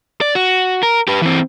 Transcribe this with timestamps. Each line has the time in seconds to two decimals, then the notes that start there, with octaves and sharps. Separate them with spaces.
0.21 D5
0.35 F#4
0.83 A#4
1.08 G4 B4
1.22 E3 C4